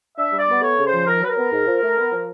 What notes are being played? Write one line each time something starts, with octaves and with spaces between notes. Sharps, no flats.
D4 E5
G3
D5
B3
A3 C#5
C#3
C5
F3
D#3 A#4
F#3 B4
A#4
B3
G#2
F3
A3
B3
F3